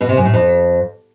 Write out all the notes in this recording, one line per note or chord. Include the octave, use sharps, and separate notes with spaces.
B2
C3
F#2
A2
F2